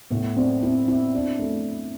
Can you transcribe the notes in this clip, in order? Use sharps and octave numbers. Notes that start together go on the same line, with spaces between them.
A2 B3
C4 D4
C4 E4
C4 E4
D4
A3